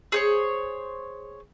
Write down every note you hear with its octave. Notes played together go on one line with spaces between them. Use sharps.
G#4 C5 C#5